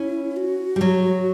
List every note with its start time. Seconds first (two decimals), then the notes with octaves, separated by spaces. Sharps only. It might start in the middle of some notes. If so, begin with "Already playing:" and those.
Already playing: C#4 E4
0.37 F#4
0.76 G3
0.81 F#3